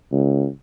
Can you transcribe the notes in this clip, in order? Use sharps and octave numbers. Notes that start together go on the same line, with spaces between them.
C#2